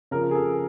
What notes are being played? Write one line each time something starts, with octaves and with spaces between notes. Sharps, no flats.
C#3 F3 A#4
G#4
A4